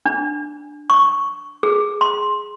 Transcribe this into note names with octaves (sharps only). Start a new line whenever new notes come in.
D4
C#6
G#4
C6